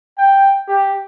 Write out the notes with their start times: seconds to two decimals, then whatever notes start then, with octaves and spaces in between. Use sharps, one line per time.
0.18 G5
0.68 G4